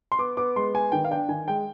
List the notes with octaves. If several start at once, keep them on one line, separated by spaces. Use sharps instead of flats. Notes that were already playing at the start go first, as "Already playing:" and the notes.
C6
B3 D6
B3 D6
G#3 C6
B3 G#5
D#3 G5
F5
D4 G5
D#3 G#5
G#3 G5